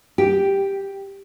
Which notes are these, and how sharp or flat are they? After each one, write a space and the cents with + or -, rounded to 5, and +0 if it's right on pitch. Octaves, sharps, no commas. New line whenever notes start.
G4 +0 G5 +0